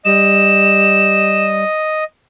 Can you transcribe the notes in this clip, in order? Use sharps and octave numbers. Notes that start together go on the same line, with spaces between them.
G3 D#5 E7